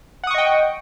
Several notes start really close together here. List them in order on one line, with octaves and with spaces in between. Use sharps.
F#5 D#6 C#6 D#5 G5